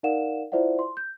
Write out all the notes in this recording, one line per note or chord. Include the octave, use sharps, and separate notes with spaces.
D#4 A#4 D5 F5 F#5 E7
E4 F4 C5 D5 E5 F#5
C6
G6